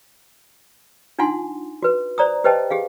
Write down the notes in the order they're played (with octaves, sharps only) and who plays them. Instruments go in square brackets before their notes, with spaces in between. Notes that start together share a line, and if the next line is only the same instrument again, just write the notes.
[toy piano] D4 D#4 F4 F#5 G#5 C6
F#4 B4
C5 D5 A#5 D#6
G4 B4 C5 D#5 G5 A5
G4 G#4 F5